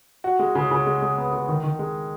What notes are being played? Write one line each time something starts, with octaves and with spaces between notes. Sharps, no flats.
F#4
G#3
C#3
C#3
G#3
G#3
B3
C#3
D#3
D#3
G#3